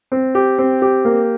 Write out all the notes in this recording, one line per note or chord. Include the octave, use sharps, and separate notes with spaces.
C4
G4
C4
G4
A#3